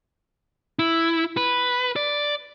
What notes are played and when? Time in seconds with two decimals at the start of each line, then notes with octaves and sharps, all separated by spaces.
0.79 E4
1.37 B4
1.96 D5